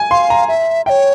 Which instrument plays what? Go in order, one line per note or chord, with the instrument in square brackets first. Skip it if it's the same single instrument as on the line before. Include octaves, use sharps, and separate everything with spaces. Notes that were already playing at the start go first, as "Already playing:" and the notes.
Already playing: [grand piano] G#5
[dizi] F5 [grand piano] C6
[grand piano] A#5
[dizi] E5
[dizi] E5 [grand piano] G5
[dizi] C#5